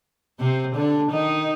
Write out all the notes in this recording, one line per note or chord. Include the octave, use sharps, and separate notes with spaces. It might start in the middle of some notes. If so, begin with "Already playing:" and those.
C3 C4
D3 D4
D#3 D#4